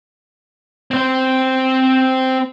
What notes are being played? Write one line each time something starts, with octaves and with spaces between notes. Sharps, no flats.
C4 C5